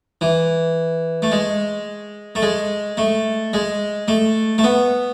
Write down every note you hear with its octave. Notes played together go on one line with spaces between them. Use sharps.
E3
A3
G#3
A3
G#3
A3
G#3
A3
A3
B3